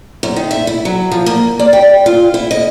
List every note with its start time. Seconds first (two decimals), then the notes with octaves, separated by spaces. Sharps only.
0.23 F#2
0.36 D#3
0.51 E5
0.67 E4
0.85 F#3
1.12 F3
1.26 A#3
1.59 D5
1.73 G5
2.06 F4
2.34 E4
2.51 D#5